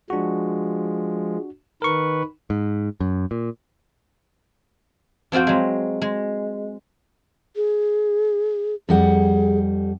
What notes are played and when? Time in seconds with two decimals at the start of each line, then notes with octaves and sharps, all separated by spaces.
0.10 F3 G#3 D4 F#4
1.82 D#3 A#4 B4 C#6
2.50 G#2
3.00 F#2
3.31 A#2
5.32 F2 C4 F4 F#4 G5
5.47 F#3 G#3
6.02 G#3
7.56 G#4
8.89 F2 G3 G#4 F#5